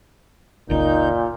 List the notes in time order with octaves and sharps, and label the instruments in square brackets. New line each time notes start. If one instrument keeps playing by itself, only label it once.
[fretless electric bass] F#1 C#2 [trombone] A#2 [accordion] D#4 G6